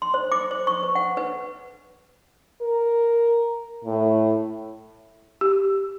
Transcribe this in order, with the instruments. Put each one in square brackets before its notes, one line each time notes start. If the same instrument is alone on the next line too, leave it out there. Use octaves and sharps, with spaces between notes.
[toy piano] C6
C5
D6
C5
C#6
B4
F#5
B4
[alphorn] A#4
A2
[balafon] G4